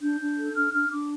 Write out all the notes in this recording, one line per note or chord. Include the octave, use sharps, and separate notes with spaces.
D4 G6
D4
A4
D4 F6
D4 F6
D4 D6